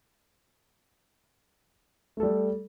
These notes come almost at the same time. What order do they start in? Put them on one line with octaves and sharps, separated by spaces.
A3 A4 G3